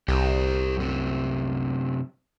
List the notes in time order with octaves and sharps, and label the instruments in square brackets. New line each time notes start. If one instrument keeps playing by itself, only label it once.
[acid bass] C2 [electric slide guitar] G4 A#4
[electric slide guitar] F#2 C3